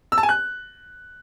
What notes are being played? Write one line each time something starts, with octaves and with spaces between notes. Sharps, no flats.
E6
A5
G#5
F#6